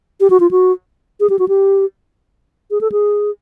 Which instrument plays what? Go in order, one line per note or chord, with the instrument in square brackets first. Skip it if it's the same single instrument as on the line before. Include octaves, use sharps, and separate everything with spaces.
[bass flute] G4
F#4
F4
F#4
G#4
G4
F#4
G4
G#4
A4
G#4